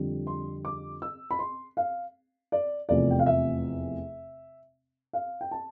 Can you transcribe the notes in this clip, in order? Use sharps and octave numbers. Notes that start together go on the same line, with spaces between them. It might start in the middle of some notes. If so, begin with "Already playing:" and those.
Already playing: F2 D3 G3
C6
D6
E6
B5
C6
F5
D5
F1 E2 C3 F3 A3 D5
G5
F5
E5
F5
G5
A5